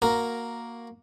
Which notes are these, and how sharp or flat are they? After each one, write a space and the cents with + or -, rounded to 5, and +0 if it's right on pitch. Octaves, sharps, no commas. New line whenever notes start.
A#3 +0 F#4 -10 A#4 +0